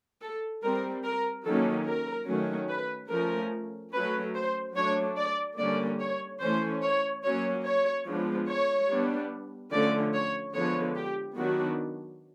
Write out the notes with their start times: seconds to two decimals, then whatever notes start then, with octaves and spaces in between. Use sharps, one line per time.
0.21 A4
0.63 G3 C4 A#4
1.04 A#4
1.45 D#3 F#3 A#3 C#4 A4
1.86 A#4
2.28 D#3 F#3 A3 C#4
2.70 B4
3.10 F3 A3 C#4 A#4
3.93 F#3 A3 C#4 B4
4.35 C5
4.75 F#3 A3 D4 C#5
5.17 D5
5.58 D3 G3 A#3 C#4 D5
6.00 C#5
6.41 E3 A3 C#4 C5
6.82 C#5
7.24 F#3 A#3 C#4 C#5
7.65 C#5
8.06 F3 G#3 B3 D4
8.48 C#5
8.89 G3 B3 D4
9.71 D3 F3 A3 C#4 D5
10.13 C#5
10.54 D3 F3 G#3 B3 C#5
10.96 G4
11.37 D#3 F#3 B3 D4 F#4